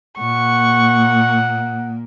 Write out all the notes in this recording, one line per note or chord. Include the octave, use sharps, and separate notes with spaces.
A#2 A#3 F#5 C#6